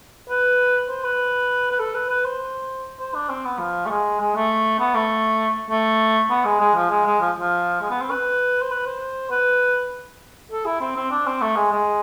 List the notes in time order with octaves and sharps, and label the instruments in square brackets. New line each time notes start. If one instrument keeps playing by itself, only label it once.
[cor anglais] B4
C5
B4
B4
A4
B4
B4
C5
C5
D4
C4
B3
F3
A3
G#3
G#3
A3
B3
A3
A3
B3
G#3
G#3
F3
G#3
G#3
F3
F3
G#3
B3
C4
B4
C5
B4
C5
B4
A4
E4
C4
C4
D4
C4
A3
G#3
G#3